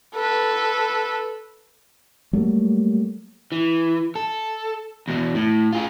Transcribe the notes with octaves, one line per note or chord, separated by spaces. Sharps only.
A4 B4
F#3 G3 A3 A#3
E3
A4
E2 B2
A2
F4 G#4